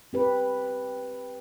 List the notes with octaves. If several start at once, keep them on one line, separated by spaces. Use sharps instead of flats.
C4 G4 B4